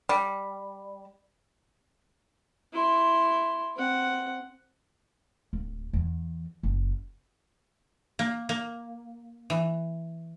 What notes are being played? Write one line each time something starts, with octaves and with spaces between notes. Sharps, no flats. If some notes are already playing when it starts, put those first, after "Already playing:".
G3
E4 C6
C4 F#5
D1
E2
F#1
A#3
A#3
E3